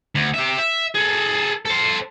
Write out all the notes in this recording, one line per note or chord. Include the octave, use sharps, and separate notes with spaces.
D2
G4 E5
E5
G#4 A4
A4 C5